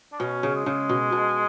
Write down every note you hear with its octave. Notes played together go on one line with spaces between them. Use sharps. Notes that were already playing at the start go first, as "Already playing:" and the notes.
D4
B2 C#4
C#3
G#3
C#3
B2
B2